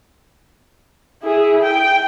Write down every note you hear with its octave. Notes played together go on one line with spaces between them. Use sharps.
E4 G#4
G5